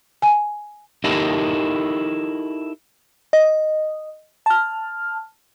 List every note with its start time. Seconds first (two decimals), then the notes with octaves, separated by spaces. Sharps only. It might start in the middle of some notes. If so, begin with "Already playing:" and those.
0.22 G#5
1.04 D#4 E4 G4 A4 A#4 D#5
3.33 D#5
4.46 A5 F6